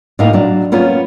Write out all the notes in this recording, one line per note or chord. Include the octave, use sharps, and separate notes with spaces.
A2 A#3 D#4 F5
F#3 D4
A#3 B3 C#4 F4